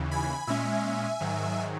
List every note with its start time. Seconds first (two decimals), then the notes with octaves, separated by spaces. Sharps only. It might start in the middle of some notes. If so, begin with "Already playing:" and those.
Already playing: D#2 C#3 E3
0.11 G#5 B5
0.47 A#2 G#3 C#4 E5 G#5
1.20 G#2 D#3 F#3